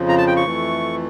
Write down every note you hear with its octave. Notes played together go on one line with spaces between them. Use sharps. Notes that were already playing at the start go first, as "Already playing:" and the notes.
Already playing: F2 C#3 F3
A#5
A5
G5
C#6
F2 E3 A3